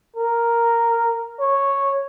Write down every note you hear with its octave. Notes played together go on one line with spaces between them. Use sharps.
A#4
C#5